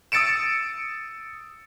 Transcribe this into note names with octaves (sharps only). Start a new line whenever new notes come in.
D#6 E6 A6 C#7 D7 E7